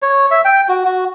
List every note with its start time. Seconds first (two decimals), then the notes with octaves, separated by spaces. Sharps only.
0.02 C#5
0.31 E5
0.45 G5
0.69 F#4
0.85 F#4